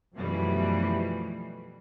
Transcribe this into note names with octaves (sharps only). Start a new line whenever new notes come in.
F#2 B2 E3 F3 G3 A3